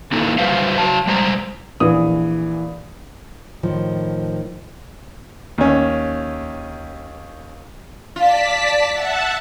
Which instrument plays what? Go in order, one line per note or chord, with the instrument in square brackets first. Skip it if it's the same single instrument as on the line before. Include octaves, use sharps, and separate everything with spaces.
[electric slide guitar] D#3 A#3 D#4 E4 A4
F#3 G3 F4 B4 C5 F5
F#3 A5
G3 G#3 C5 A#5
[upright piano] A#1 E3 D#6
[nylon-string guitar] A2 D#3 F3
[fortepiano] D#2 C#4
[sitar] F4 [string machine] D5 A5 B6
[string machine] E5 F#5 A5